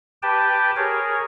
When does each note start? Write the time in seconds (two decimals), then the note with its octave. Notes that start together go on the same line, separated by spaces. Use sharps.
0.23 G4 B4 G5 A5
0.76 G#4 A#4 C#5